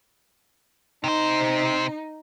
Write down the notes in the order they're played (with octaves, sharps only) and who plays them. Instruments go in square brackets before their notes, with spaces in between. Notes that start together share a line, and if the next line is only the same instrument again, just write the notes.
[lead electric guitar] C3 C5 [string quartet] D#4